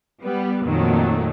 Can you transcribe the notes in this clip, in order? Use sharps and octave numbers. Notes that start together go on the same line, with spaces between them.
G3 B3
F2 A#2 D#3 F#3 A3